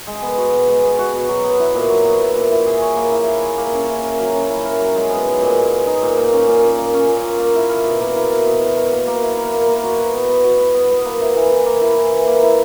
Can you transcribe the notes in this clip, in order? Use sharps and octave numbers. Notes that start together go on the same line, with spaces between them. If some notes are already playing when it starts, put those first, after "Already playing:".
G#3
B3
F#4
B2
G#3
B3
F#4
B2
F#3
B3
E4
A#2
F#3
B3
E4
A#2
E4
G#4
C#5
A#3
E4
G#4
C#5
A#3
C#4
E4
A#4
F#3
C#4
E4
A#4
F#3
G#3
B3
D#4
A#2
G#3
B3
D#4
A#2
A#3
C#4
A#2
A#2
A#3
C#4
A#2
A#2
A#3
E4
A#4
B2
A#3
E4
A#4
B2
E4
A#4
A#3
A#3
E4
A#4
A#3
A#3
F#4
B4
B3
B3
F#4
B4
B3
B3
A#3
E4
E3
E3
A#3
E4
E3
E3
A#3
E4